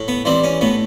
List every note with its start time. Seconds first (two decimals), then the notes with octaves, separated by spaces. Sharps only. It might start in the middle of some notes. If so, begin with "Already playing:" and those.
Already playing: A2
0.08 B3
0.25 E3 G3 C4
0.44 C#4
0.61 A2 B3